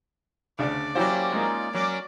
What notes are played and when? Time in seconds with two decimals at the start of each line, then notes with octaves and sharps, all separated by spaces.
0.59 D2 C#3 D4 D5
0.95 F#3 A#3 C#4 E4 F#4 G4 C5
1.32 G#3 A#3 C#4 D#4 F4
1.75 F#3 C#4 A#4 D5 D6